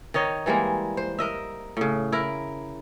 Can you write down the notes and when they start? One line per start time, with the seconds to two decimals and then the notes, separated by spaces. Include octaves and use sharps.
0.14 D#3 D#4 C#5 D#5
0.46 E3 G3 G#3 A#3
0.97 C5
1.19 A#4 D#5 E5
1.77 A2 C#3
2.12 E4 A#4